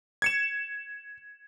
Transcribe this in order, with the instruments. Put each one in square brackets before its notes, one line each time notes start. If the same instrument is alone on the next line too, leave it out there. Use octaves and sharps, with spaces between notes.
[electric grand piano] G#6 C#7 E7